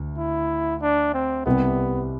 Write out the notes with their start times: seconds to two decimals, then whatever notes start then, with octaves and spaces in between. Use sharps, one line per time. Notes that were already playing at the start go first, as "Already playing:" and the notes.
Already playing: D2
0.18 E4
0.82 D4
1.14 C4
1.46 C2 C3 G3 B3